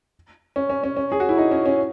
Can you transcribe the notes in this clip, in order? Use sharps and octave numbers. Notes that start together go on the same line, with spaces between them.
C#4
C#4
C#4
C#4
G#4
F#4
E4
D#4
C#4
C#4